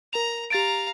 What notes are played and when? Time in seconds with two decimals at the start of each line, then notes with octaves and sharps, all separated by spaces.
0.13 A#4 A#5 F7
0.50 G4 F5 A#5 A6 D7